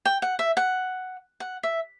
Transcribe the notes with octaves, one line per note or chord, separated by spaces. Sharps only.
G5
F#5
E5
F#5
F#5
E5